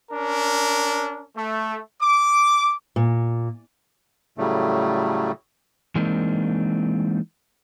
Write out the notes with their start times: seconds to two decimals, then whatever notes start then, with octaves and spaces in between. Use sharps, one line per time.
0.11 C#4 D4 A#4
1.37 A3
2.02 D6
2.96 A#2
4.38 A2 C#3 F#3 G3 A3
5.95 E3 G#3 A#3 C4 D4 D#4